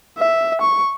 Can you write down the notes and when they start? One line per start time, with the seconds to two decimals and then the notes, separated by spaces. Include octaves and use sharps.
0.18 E5
0.62 C#6